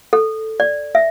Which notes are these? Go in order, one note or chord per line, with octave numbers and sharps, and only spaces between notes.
A4
D5
E5